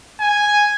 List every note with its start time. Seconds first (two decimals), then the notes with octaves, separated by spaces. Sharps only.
0.20 G#5